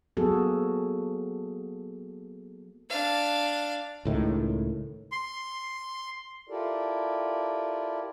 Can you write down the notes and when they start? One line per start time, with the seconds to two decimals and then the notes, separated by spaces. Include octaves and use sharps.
0.17 F#3 A#3 B3 F#4 G#4 A4
2.90 D4 F5
4.05 C#2 A2 D#3
5.12 C6
6.49 E4 F4 G4 A4 A#4 D5